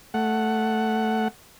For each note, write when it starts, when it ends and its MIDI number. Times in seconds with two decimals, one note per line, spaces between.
0.14 1.28 57
0.14 1.28 78